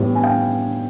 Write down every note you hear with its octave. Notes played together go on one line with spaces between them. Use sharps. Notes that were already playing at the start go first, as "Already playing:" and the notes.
Already playing: A2 E3 G3 B3
G#5
F5 G5